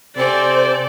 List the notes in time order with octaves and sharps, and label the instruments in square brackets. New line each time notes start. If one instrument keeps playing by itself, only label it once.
[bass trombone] C3 [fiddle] C4 G#5 [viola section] A4 D5 [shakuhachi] C5